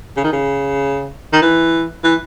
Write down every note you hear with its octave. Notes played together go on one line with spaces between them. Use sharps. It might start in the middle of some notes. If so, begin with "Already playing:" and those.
C#3
D#3
C#3
D#3
E3
E3